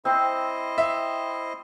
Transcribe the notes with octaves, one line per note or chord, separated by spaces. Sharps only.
C4 E4 C5 D#5
E5